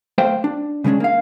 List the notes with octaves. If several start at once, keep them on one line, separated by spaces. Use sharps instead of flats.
A3 C5 F5 G5
D4
C#3 G#3 A#3 C#4 D4
A#3 F5